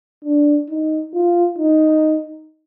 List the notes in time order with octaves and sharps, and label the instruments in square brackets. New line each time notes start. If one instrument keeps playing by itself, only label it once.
[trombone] D4
D#4
F4
D#4